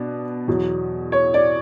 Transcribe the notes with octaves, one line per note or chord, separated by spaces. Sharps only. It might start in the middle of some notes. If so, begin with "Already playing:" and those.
Already playing: B2 B3 D4
E2 B2 F#3
C#5
D5